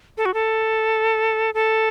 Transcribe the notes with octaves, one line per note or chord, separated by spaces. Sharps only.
A4
F#4
A4
A4